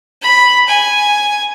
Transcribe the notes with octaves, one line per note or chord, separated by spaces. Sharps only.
B5
G#5